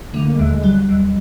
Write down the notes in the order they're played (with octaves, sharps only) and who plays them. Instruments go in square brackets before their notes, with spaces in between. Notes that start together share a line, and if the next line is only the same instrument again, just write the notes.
[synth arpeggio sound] D3 [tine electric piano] A3
[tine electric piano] A#3
G#3
[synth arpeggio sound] D#2 [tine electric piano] A3
[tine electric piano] G#3
[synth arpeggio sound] F#3 [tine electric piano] G3
[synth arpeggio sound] D#2